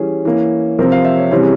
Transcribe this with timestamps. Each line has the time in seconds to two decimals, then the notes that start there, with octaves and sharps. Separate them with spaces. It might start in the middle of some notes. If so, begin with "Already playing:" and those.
Already playing: E3 G3 C#4 G#4
0.25 E3 A#3 C#4
0.79 C3 F3 C4 A#4
0.92 F5
1.05 E5
1.17 C#5
1.31 C3 E3 G3 C#4 C5
1.40 G#4